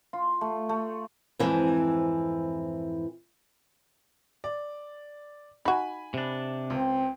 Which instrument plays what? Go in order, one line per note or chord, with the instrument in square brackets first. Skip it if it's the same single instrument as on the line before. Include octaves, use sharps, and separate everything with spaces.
[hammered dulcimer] F4
A3
A3
[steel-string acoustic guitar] F2 G#2 E3 C4
[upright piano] D5
[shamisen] D#4 F#4 [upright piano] G#5 B5
[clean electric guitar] C3 D4
[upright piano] C#2 [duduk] C4